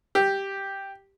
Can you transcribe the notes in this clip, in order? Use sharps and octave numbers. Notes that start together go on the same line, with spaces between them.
G4